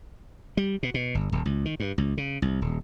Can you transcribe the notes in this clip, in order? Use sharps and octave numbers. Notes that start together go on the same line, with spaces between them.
G3
B2
B2
G1
D#1
C#2
D#3
G2
C#2
C#3
C2
D#1